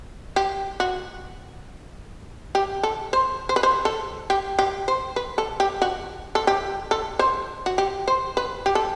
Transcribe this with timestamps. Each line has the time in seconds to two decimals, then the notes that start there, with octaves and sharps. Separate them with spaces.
0.36 G4
0.80 F#4
2.55 G4
2.83 A4
3.13 C5
3.49 C5
3.56 B4
3.63 C5
3.85 A4
4.30 G4
4.59 G4
4.88 C5
5.16 B4
5.38 A4
5.60 G4
5.82 F#4
6.35 A4
6.47 G4
6.91 A4
7.19 C5
7.66 F#4
7.78 G4
8.08 C5
8.37 B4
8.66 G4
8.75 A4